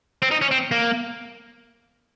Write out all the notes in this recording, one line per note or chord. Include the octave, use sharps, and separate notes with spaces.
C4
D#4
C#4
C4
A#3